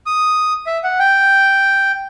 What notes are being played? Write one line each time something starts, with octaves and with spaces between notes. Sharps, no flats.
D#6
E5
F#5
G5